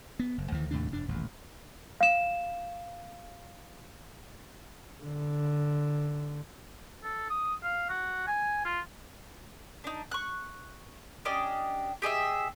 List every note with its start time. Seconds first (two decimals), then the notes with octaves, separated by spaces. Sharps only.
0.19 B3
0.38 F#1
0.52 D2 D#3 E3
0.71 D#2 A2 C3 D4
0.91 F1 G2 D4
1.08 D#1 A1 E2
2.01 F5 E7
5.03 D3
7.03 A4
7.30 D#6
7.64 F5
7.90 F#4
8.27 G#5
8.65 F4
9.84 D4 D#4
10.11 C#6 F#6
11.25 C#4 D4 G4 D#5
12.02 G4 G#4 D#5 E5